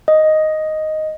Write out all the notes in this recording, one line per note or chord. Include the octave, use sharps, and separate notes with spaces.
D#5